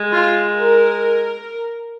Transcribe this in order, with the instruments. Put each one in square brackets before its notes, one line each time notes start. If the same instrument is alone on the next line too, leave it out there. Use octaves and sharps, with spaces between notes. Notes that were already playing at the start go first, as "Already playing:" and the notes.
Already playing: [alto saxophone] G#3
[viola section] F4
A#4